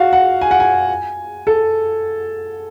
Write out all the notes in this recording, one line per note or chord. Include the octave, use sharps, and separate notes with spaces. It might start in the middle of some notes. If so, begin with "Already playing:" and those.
Already playing: F#4 F5
F#5
G#5
F#5
G#5
A4